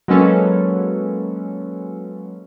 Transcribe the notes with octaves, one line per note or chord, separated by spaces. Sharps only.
F#3 G#3 A#3 C#4 A4 B4